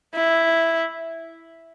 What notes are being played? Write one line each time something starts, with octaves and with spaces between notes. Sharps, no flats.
E4